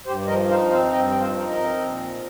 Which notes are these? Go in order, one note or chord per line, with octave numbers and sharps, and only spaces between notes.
G2 G4 C5
F3 A#4 D#5
D#4 C5 F5
C4 C5 F5
G2 D#5 G5
F3 G5
C5 F5
D#4
A#4 D#5
C4
A#2
F3